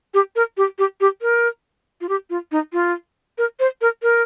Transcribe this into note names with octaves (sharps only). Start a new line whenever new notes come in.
G4
A#4
G4
G4
G4
A#4
F4
G4
F4
D#4
F4
A#4
C5
A#4
A#4